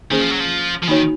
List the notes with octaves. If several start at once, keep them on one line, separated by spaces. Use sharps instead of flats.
D#3 A#3 C#4 G#4 C5
F3
F#3
F3
F3
D#3 A#3 D#4 F#4 C#5